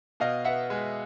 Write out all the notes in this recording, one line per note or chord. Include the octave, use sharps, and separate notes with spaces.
B2 D#5 F5
B3 E5 F#5
G#3